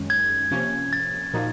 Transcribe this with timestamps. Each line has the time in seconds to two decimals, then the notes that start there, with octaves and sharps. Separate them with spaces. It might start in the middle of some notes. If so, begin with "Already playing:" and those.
Already playing: F#2 D#3 G#3 C#4
0.10 G#6
0.51 C3 F3 A#3 C#4
0.93 A6
1.34 A#2 F3 A#3 D#4 F#4